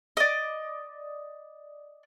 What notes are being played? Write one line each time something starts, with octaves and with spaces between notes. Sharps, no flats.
D5 D#5